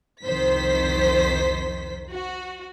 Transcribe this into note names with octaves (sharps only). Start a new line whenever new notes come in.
C2 F2 D#3 C5 B6
F#4